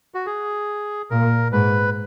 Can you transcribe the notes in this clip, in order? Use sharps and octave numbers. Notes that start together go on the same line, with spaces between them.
F#4
G#4
A#2 A#4
G#2 B4